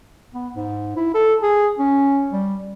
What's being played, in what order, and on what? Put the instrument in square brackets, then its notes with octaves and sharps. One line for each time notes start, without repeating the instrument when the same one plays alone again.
[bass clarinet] B3
G#2
E4
A4
G#4
C#4
G3